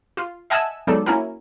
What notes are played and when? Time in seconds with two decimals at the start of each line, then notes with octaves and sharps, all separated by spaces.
0.17 F4
0.50 D#5 E5 F#5 G#5 A5 E6
0.87 F#3 G#3 B3 D#4 A4 D5
1.06 A#3 C#4 E4 F#4 A#4